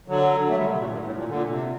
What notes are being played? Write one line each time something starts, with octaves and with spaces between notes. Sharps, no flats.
D3 F#3
F#3 A3
D#3 G3
C3
A#2
G2
A2
A#2
A#2 D3
C3